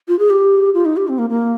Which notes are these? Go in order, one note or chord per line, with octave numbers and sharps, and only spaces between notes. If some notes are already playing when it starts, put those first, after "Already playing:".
F4
G#4
G4
F4
D#4
G4
C4
A#3
A#3